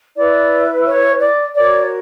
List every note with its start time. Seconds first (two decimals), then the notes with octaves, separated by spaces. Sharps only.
0.16 E4 B4 D5
0.85 C#5
1.20 D5
1.55 F#4 A#4 C#5 D5
1.83 C#5